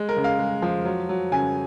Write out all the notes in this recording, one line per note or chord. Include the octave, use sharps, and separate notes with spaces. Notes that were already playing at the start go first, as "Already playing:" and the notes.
Already playing: G#3
A#4
C#3
F5
G#3
F3
F#3
F#3
C#3 G#5